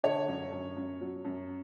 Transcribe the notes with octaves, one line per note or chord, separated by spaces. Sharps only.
D3 C#5
F#2
F#2
F#2
F#3
F#2